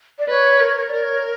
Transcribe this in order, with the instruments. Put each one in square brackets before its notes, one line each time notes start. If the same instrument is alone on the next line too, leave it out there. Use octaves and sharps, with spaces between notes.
[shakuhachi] D5
[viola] B4 [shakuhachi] C#5
[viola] A#4
[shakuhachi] C#5
[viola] A#4 [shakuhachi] D5
[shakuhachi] C#5